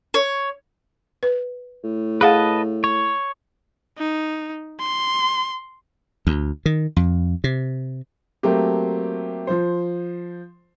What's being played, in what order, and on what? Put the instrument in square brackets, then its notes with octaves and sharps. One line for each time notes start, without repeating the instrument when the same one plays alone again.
[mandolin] C#5
[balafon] B4
[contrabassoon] A2
[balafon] G#4 F5 F#5 [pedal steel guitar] B4 D#5 A5
[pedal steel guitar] C#5
[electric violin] D#4
C6
[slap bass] D2
D#3
F2
C3
[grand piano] F#3 A3 A#3 C4 G4
F3 C5